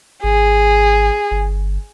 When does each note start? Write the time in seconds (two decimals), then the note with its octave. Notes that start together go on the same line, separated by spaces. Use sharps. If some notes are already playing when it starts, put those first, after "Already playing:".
0.24 G#1 G#4
1.31 G1